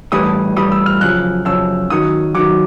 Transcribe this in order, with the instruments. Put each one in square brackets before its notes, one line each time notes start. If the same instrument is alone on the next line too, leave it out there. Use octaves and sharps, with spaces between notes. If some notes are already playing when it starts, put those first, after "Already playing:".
[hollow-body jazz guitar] A2 E3 G3 [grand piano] D#6
[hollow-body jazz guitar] A2 E3 G3 [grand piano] D#6
[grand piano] E6
F6
[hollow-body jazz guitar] F#2 C#3 F3 [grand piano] F#6
[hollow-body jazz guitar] F#2 C#3 F3 [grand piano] E6
[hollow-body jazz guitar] F#2 D#3 F#3 [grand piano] D#6
[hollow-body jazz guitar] F#2 D#3 F#3 [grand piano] D6